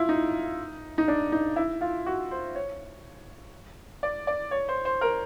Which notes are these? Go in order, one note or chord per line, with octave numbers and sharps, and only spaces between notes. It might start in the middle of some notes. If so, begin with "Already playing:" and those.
Already playing: E4 F4
D#4
D#4
D4
D#4
E4
F4
F#4
C5
C#5
D5
D5
C#5
C5
C5
A#4